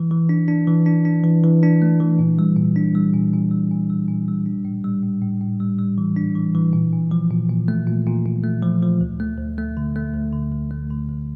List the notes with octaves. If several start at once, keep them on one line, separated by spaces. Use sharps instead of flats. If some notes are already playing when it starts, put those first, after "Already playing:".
Already playing: E3
E3
D4
D4
E3
D4
D4
E3
E3
D4
A3
E3
A#2
G3
A#2
D4
G3
A#2
A#2
G3
A#2
G3
A#2
G3
D4
A2
G3
A2
A2
A2
G3
G3
E3
D4
E3
E3
A#2
A#2
F3
A#2
A#2
A3
A#2
A#2
A#2
A3
F3
F3
D2
A3
D2
A3
D3
A3
D2
D3
D2
A3
D3
D2